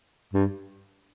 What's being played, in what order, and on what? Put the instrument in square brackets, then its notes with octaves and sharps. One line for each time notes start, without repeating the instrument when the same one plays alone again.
[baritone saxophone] G2